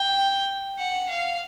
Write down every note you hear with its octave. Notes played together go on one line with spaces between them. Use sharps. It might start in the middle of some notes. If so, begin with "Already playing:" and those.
Already playing: G5
F#5
F5